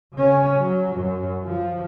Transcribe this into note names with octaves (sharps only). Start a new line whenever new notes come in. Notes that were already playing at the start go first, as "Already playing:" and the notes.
C#3 C#4
F#3
F#2
F3